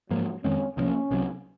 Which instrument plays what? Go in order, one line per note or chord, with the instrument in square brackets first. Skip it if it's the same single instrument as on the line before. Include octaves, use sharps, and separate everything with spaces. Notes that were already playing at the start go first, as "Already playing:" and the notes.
[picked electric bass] G#2 F3 A#3 [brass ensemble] F#3
[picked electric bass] F2 D#3 G#3 C4 [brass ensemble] C#4
[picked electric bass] C2 C3 F3 A#3 [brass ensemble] C#4
[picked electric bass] C2 C3 F#3